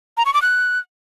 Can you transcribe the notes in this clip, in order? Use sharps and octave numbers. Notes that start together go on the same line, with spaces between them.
A#5
C#6
D6
F#6